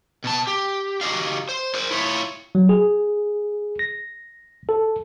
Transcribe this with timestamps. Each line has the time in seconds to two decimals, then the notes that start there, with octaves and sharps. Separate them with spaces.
0.24 B2 A5
0.47 G4
1.01 F#4 G4 D#5 F5
1.49 C5
1.74 A#4 C5
1.91 E4 F4 C#5 E5
2.55 F#3
2.69 G#4
3.79 A#6
4.69 A4